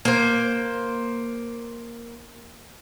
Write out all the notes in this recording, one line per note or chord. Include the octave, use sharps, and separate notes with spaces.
A#3 C5